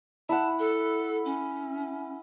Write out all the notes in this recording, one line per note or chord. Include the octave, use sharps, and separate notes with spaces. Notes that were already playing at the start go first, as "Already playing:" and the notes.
E4 F#5 A5
A4
C#4